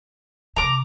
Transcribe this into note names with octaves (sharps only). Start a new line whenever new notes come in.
C3 A#5 D6